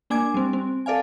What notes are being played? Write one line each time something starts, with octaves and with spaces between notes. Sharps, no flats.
A#3 D4 G#5 D6 G#6
G3 C4
C4
A4 D5 F5 G#5